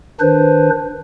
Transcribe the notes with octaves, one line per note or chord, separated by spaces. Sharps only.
D#3 D4 B4 C5